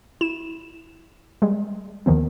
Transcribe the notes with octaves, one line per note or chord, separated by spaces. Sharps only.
E4 E7
G3 G#3
D#2 D#3 F3 B3